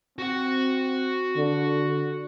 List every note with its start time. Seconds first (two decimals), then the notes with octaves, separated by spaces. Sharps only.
0.18 C4 F#4 F#5
1.37 D3